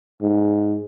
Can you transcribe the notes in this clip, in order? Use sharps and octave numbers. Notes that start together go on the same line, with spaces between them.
G#2